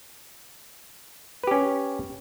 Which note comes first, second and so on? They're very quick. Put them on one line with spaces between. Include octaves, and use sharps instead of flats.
B4 G4 C#4